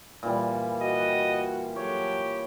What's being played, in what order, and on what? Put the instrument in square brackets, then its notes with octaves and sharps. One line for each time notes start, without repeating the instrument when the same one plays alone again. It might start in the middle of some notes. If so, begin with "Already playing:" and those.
[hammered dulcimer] A#2 E3 G3
[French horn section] F#4 [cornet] D#5
[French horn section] F#3 A3 [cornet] G4 [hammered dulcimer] C#5